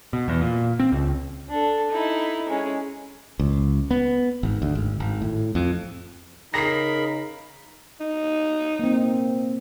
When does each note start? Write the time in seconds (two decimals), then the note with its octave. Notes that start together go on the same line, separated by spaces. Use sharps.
0.13 B2
0.28 E2
0.41 A#2
0.79 C4
0.92 C#2
1.49 D4 A4
1.91 D#4 E4
2.49 G#3 C#4
3.39 C#2
3.91 B3
4.43 G#1
4.62 D2
4.75 G#1
5.00 G#1
5.22 A2
5.55 F2
6.54 C#3 D#4 G#4 A#4 B5 A#6 C7
8.00 D#4
8.79 A#3 C4